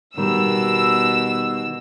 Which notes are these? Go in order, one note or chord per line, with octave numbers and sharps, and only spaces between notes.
B2 D#3 G3 E6